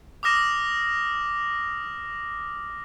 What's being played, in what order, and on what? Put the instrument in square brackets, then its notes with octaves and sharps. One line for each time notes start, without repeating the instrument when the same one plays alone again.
[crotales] D6 D#6 F6 A#6 E7